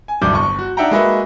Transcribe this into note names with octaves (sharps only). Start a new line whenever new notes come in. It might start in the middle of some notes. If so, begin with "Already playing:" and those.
G#5
D1 C2 G2 D6 G6
G1 C#6
F#4
D4 D#4 E5 F#5 G5 A#5
G#3 A#3 F#4 B4 D#5 E5